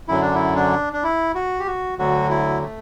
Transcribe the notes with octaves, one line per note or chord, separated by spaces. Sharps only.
F#2 D3 F#3 E4
D4
E4
D4
D4
E4
F#4
G4
F#4
D2 D3 F#3 F#4
E4
A3